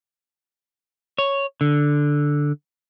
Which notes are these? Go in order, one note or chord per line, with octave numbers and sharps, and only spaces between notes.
C#5
D3